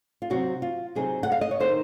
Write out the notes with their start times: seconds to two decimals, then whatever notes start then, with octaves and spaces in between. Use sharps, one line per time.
0.22 F4
0.30 C3 F#3 C4 D#4 F#4
0.62 F4
0.95 C3 F#3 C4 D#4 G#4
1.23 F#5
1.32 F5
1.41 D#5
1.51 C#5
1.60 D#3 A#3 D#4 C5